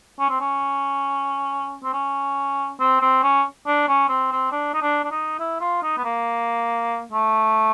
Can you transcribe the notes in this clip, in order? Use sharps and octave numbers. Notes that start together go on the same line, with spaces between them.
C#4
C4
C#4
C4
C#4
C4
C4
C#4
D4
C#4
C4
C4
D4
D#4
D4
D4
D#4
E4
F4
D#4
B3
A#3
A3